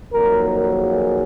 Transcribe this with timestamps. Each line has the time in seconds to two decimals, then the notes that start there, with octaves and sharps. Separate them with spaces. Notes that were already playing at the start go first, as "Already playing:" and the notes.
0.12 F2 D#3 F#3 A#3 A#4
0.45 A#4
0.76 G#4